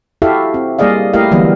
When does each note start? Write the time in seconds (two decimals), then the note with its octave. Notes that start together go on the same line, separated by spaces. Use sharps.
0.22 E4 F#4 G4 A4 E5 F5
0.54 C4
0.79 G3 A#3 G#4 D5 D#5 F5
1.14 A3 E4 G4 A#4 D#5 F5
1.31 D3 E3 F#3 G3 A#3 B3